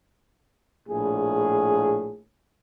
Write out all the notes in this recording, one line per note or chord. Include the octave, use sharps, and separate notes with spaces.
A#1 A2 G#4